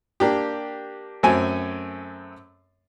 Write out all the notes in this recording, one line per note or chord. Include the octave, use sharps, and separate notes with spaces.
A#3 D4 G4
F#2 A3 C4 G#5